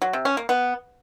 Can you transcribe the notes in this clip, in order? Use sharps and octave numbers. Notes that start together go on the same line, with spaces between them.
F#3
C3
C#4
A#3
B3